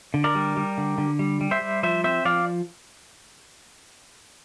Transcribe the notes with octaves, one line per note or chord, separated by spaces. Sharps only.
D3
A#4 D5
G3
G3
D3
D3
G3
G3
C5 E5
G3
F3 C5 E5
C4 C5 E5
F3 D5 F5